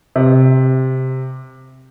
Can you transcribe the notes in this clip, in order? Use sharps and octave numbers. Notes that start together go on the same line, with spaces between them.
C3